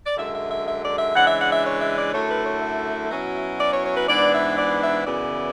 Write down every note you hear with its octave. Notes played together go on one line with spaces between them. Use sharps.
D5
F#2 D3 G#3 E5
E5
E5
E5
D5
E5
C#3 E3 G#3 D4 F#5
E5
F#5
E5
C#5
E5
D5
F#2 D3 A3 E4 C#5
B4
C#5
E5
B2 F#3 C#4 E4
D5
C#5
C#5
B4
G#2 E3 B3 D4 D5
E5
D5
E5
F#2 C#3 E3 B3 E4 D5